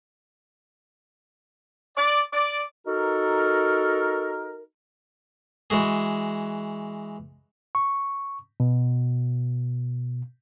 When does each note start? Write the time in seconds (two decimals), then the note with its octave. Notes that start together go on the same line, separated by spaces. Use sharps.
1.97 D5
2.33 D5
2.87 D#4 F#4 A4 A#4
5.70 E3 G#3 F#4 G#4
7.75 C#6
8.60 B2